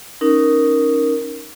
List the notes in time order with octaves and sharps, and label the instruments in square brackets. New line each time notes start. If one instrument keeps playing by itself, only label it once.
[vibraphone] C#4 D#4 A#4